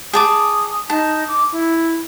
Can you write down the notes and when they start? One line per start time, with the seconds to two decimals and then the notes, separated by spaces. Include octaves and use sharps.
0.13 G#4 A5 D6 D#6
0.90 D#4 A5
1.28 D6
1.52 E4